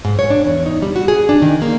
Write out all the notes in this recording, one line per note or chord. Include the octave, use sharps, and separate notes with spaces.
G#2
C#5
D4
E2
D#4
G3
F#4
G#4
D4
D#3
A#3